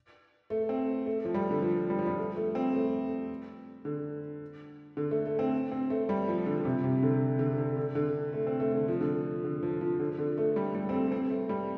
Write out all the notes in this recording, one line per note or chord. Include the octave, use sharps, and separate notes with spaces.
A3
C4
A3
F3
G3
D3
F3
G3
F3
G3
A3
A3
C4
A3
D3
D3
A3
A3
C4
C4
A3
G3
F3
D3
C3
C3
D3
D3
D3
D3
D3
A3
C4
A3
D3
F3
D3
D3
F3
F3
D3
D3
A3
G3
G3
C4
A3
C4
A3
G3